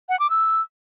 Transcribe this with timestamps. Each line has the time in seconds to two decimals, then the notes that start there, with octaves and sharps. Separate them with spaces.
0.09 F#5
0.19 D6
0.30 E6